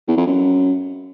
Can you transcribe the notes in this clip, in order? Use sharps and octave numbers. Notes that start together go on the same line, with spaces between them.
E2
F2
F#2